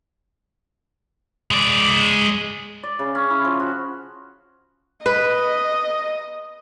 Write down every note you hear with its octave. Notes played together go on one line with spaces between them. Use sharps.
G#3 D5
D5
C#3
C#4
E4
F3
F#4
B4 D#5